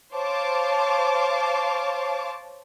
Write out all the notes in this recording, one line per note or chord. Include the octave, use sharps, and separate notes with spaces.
C5 C#5 F5 A5 D6